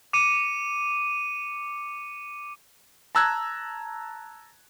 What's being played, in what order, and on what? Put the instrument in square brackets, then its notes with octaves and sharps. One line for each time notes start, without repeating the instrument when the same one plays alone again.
[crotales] D6 C#7 D#7
[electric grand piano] A5 A#5 E6 F#6 G#6